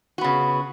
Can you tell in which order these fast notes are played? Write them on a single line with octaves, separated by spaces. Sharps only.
F#4 B3 C#3